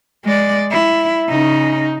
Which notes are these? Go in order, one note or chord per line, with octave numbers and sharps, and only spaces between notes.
G#3 D5
E4
C#3 D#4